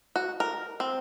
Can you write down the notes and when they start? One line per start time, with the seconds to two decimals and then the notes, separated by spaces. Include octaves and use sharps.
0.16 F#4
0.40 A#4
0.80 C4